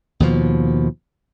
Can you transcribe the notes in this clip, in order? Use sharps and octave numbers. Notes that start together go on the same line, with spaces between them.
D#2 B2 F3